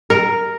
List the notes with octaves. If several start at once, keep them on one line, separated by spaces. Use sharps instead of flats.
A#4